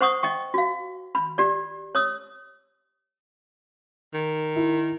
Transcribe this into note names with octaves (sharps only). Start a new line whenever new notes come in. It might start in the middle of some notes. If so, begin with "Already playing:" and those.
C5 F#5 C#6 D#6
D#5 G5 C#6
F#4 F5
B5
G4 D5
C#5 D#6 E6
D#3
E4